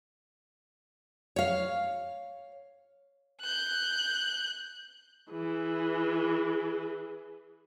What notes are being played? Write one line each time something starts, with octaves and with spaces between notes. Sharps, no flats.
C#5 F5
F#6 G6
E3 G#4